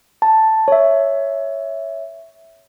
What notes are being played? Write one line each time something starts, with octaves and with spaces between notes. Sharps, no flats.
A5
C#5 E5